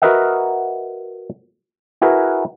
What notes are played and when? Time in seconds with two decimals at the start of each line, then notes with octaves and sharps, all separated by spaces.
0.02 F#4 A#4 B4 D#5 E5 F#5
2.02 E4 F#4 G#4 A#4 B4